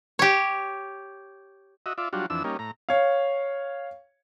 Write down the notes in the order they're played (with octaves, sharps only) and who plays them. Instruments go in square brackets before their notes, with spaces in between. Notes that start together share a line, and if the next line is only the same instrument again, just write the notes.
[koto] G4 C#5
[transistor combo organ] F#4 D#5 E5
F4 D5 E5
F#3 G3 D4 F4 F#4
F2 E3 D4 E6
G3 A#3 C#4 D#4
A2 A#5
[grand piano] C#5 F5